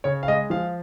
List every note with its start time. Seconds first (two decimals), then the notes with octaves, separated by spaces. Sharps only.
0.04 C#3 C#5
0.23 F5
0.28 G#3 D#5
0.50 F3 F5